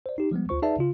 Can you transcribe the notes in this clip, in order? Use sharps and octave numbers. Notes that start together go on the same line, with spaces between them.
C5 D5
D#4 G4
F3 G3 G#3 B3
D2 F4 C5 C#6
D#4 G#4 B4 D5 E5 A5
C#3 F4